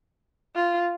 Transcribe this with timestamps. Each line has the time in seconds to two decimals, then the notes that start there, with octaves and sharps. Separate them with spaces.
0.55 F4